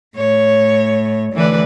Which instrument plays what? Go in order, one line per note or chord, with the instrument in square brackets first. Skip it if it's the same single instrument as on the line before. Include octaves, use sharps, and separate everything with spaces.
[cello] A2 [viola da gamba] C#5
[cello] D2 [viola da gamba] E3 B4 D5